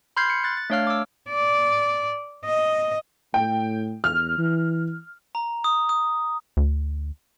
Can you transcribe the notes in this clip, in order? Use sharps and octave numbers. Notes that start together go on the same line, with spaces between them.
B5 C6 F6 G6 G#6 C7
C#7
F#6 A6
A6
A3 D4 C#5 F5 F6
D6 E6
D5
D#5
A2 G5
E2 F6
E3
A#5
D#6
D#6
D2